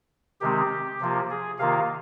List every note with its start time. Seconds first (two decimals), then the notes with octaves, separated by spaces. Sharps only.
0.41 C3 D#3 G#3 C4 G4
1.01 C3 F3 A#3 F4
1.30 G#4
1.59 C3 D#3 A#3 F4 F5